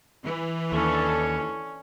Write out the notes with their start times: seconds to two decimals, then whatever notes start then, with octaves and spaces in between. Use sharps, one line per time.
0.23 E3
0.72 D#2 C#4 D4 A4 C#5